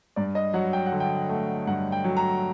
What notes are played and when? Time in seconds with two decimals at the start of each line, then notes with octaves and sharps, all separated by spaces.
0.16 G2 D5
0.35 D#5
0.54 F#3 F#5
0.73 G5
0.86 F#5
0.92 D3
1.00 G5
1.29 A3
1.67 G2 F#5
1.92 G5
2.04 F#3
2.17 A#5